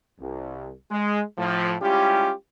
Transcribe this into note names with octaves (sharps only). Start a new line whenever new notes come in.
C2
G#3
A2 F3
G3 G#3 C#4 E4 F4 G4